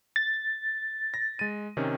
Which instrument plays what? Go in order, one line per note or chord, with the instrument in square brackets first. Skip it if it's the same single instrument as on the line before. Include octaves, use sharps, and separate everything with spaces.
[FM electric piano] A6
[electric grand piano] A#6
G#3 D#7
C3 D#3 C#4